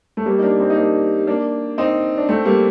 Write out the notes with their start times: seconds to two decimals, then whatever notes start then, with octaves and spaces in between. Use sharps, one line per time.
0.17 A3
0.26 G3 A#3
0.38 D#4
0.43 A#3 D4
0.60 C4 D#4
0.70 D#4
0.77 A#3 D4
1.27 A#3 D4
1.78 C4 D#4
2.18 D4
2.28 A3 C4
2.45 G3 A#3